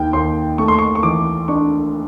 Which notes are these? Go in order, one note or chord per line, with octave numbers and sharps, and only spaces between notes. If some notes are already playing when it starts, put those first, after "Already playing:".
Already playing: D#2 G5
D#2 C6
A3 C#6
C6
C#6
C#6
E3 D6
D4 C#6